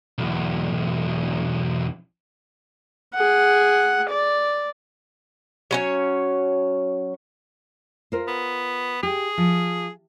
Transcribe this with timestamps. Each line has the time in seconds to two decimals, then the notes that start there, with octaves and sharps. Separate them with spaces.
0.18 B1 E2
3.15 G#4 F#5
4.10 D5
5.71 F#3 C#4 C#5
8.12 F4 A#4 C5
8.28 B3
9.03 G4 G#4
9.38 F3